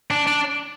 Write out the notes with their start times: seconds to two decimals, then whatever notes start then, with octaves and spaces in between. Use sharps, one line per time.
0.10 D4
0.27 D4